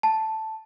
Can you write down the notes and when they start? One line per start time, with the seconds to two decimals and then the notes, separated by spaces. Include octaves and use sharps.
0.03 A5